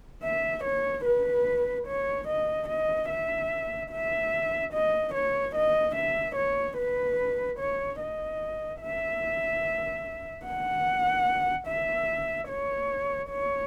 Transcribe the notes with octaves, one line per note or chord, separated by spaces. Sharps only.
E5
C#5
B4
C#5
D#5
D#5
E5
E5
D#5
C#5
D#5
E5
C#5
B4
C#5
D#5
E5
F#5
E5
C#5
C#5